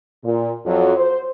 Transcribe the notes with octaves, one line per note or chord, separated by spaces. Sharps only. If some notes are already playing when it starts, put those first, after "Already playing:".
A#2
F2 F#3
C5